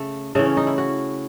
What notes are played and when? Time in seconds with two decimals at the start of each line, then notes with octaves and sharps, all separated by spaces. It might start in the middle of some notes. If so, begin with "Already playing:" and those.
Already playing: C#3 A3
0.35 C#3 E3 A3
0.45 C#4
0.57 D#4
0.67 E4
0.78 F#4